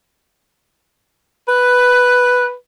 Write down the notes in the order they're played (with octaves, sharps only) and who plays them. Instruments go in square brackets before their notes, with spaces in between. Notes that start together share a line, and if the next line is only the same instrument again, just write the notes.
[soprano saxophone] B4 [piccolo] F#6